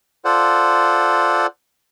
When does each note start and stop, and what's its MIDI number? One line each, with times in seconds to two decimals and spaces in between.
0.25 1.47 65
0.25 1.47 69
0.25 1.47 72
0.25 1.47 74
0.25 1.47 78